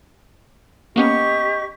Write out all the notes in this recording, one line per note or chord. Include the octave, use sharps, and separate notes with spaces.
A#3 B3 C#4 G4 D#5 C#6